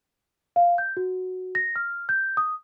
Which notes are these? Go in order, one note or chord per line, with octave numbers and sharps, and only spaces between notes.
F5
G6
F#4
A#6
F6
G6
D#6